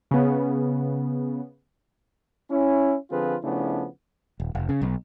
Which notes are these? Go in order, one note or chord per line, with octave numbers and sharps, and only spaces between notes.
C#3 B3
C#4 E4
D3 F3 C4 F4 G#4 B4
C#3 F3 A3 B3 D4 E4
D#1
F1
C#3
B1